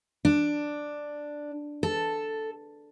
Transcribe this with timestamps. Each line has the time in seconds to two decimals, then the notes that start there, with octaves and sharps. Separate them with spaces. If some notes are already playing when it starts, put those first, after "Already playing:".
0.25 D4
1.83 A4